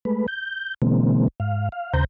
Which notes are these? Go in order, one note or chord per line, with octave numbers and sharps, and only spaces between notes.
G#3 A3 B4
G6
B2 D3 E3 G#3 A#3 C4
G#2 F5
F5
D#2 C#3 C5 A#5 G6